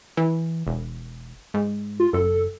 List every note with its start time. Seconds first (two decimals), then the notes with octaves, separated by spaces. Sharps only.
0.17 E3
0.67 E1
1.54 G#2
2.00 F4
2.13 F#1 A4